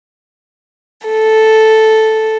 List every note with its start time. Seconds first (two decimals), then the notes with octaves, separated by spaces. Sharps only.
1.08 A4